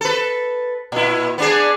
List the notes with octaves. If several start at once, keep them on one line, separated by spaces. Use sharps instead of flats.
A4 B4
A#2 E4
B3 D4 G#4